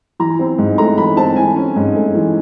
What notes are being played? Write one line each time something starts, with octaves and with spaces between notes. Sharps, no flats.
E3 A#5
C4
G#2
A3 A#5
E3 B5
C4 A5
E3 G#5
C#4
G#2
A3
E3